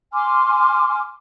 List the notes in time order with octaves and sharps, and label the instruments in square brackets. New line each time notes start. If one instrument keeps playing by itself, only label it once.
[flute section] G#5 C6 D6 F6